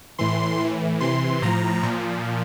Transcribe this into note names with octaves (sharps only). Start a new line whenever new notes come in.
A2 E3 C6
A2
E3
C3 E3 C6
A2 F3 A#5
A#2 F3